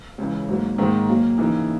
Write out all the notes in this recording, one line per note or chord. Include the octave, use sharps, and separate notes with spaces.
C#2 C#3 E3
G#2 F#3 A#3
G#2 D#3 A#3
A#2 F#3 A#3
C#3 E3 A#3 D#4